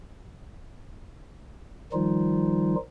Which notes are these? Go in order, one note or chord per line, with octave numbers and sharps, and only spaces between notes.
D#3 F3 G3 D#4 F4